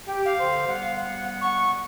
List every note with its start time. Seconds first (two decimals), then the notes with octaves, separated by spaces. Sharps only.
0.06 G4
0.25 F5
0.39 D3 C5
0.68 G3 B3 F#5
1.41 C#6